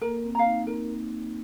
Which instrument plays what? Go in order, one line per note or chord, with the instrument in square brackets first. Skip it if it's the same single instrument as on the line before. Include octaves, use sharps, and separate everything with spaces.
[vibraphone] A#3 [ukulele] A#4
[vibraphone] C4
[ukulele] F5 A#5
[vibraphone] D#4
[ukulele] A#4